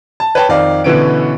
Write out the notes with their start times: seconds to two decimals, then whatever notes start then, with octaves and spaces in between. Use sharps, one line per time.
0.20 A5
0.35 B4 C#5 G5 A5
0.49 F2 D#3 D5 F5
0.84 B2 D3 E3 B3 C#4 D7